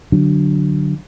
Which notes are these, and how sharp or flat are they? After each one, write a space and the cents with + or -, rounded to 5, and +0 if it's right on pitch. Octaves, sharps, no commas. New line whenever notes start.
D3 +0 F#3 +0 D4 +0